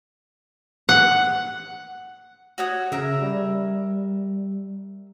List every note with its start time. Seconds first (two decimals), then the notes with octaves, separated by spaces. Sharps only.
0.89 F#5
2.58 F#4 C#5 D#6
2.92 C#3 A#4 E5
3.22 G3